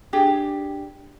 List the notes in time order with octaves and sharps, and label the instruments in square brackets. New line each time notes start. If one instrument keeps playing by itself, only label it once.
[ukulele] D4 G4 G#4